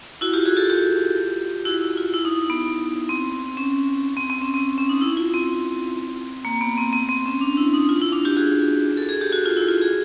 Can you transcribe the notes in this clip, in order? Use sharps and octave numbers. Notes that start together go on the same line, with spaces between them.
E4 F#4
F4 G4
F#4 G#4
G4 A4
F4 G4
E4 F#4
E4
F4
E4
D#4
B3
C4
C#4
C4
C4
C#4
C4
C#4
D#4
E4
F4
C4
A#3
B3
C4
C4
C4
C#4
D4
E4
D#4
F4
E4
D4
F4 G4
F#4 G#4
A4
G#4
G4
F#4
F4
E4
F4
F#4 G#4